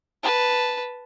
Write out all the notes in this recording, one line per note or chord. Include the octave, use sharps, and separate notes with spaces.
B4 A5